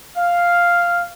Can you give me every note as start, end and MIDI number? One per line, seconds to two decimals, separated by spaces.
0.17 1.09 77